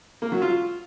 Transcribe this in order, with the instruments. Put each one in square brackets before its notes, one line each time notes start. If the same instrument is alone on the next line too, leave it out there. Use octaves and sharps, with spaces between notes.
[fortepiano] A#3
F#3
F4